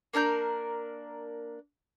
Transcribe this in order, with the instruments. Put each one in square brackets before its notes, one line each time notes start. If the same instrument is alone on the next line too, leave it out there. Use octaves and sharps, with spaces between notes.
[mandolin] A#3 D4 A#4 G6